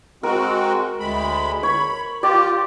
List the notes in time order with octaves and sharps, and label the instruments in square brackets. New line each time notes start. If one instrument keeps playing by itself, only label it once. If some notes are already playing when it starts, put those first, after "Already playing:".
[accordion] G#3 C4 F#4 [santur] A#4
[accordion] D2 G#3 B5
[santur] C#5 [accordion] B5
[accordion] F4 [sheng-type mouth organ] G4 [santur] D5